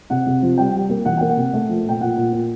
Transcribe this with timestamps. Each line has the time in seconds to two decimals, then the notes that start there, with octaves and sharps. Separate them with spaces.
0.10 C3 F#5
0.27 C3
0.42 F3
0.58 G3 G5
0.74 G3
0.89 A#3
1.05 E3 F#5
1.17 A#3 G5
1.29 F#5
1.37 C3
1.53 A3
1.69 F3
1.86 A#2 G5
2.01 A#2 F#5
2.17 A#2
2.33 A#2